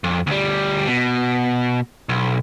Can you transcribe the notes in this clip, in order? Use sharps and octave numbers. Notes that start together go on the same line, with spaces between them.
F2
D2 G3
B2
B1